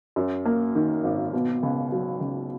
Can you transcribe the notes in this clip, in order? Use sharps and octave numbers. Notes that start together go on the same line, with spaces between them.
F#2
A#3
D#3
G#1
B2
C#2
F#3
C#2